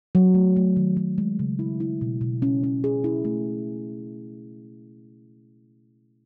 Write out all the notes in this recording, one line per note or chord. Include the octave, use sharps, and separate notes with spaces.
F#3
A3
A3
D#3
F#3
G#3
C#3
E4
E4
B2
B2
C#4
C#4
G#4
E4
A3